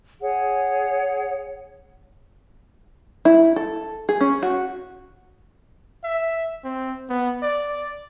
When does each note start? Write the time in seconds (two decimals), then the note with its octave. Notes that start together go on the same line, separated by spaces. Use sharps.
0.21 G#4 C#5 F#5
3.25 E4
3.56 A4
4.09 G#4
4.21 C#4
4.43 F#4
6.04 E5
6.64 C4
7.09 B3
7.43 D5